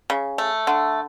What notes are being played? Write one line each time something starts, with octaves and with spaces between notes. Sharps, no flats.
C#3
A3
D3